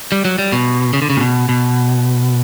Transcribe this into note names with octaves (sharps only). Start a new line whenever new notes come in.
G3
F#3
G3
B2
C#3
D3
C#3
A#2
B2
B2